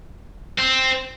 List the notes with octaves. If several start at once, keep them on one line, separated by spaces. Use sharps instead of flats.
C4